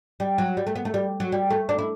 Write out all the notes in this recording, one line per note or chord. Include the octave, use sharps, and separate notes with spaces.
G3
F#3
G3
A3
B3
A3
G3
F#3
G3
A3
D4
E4